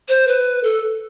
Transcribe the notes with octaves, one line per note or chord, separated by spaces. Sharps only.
C5
B4
A4